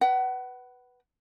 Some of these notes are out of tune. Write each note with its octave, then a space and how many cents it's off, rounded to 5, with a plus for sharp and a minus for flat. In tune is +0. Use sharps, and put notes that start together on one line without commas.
B4 +0 F#5 +30